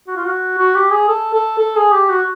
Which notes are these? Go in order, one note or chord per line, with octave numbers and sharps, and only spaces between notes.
F#4
F4
F#4
F#4
G4
G#4
A4
A4
A4
G#4
G4
F#4